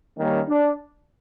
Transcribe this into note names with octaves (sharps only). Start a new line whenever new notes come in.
D#3 G3 A#3 C#4
D4